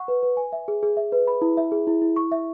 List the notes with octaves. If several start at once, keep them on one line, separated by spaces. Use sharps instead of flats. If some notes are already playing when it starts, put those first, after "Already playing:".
Already playing: F#5 C#6
B4
B4
G#5
E5
G#4
G#4
E5
B4
B5
E4
E5
G#4
E4
E4
C#6
E5